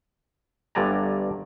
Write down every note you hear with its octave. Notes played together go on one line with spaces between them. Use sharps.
G1 G2 D3 D5 G#5 A#5